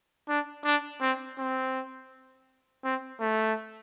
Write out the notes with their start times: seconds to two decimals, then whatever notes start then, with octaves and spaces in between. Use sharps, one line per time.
0.29 D4
0.65 D4
1.01 C4
1.38 C4
2.84 C4
3.21 A3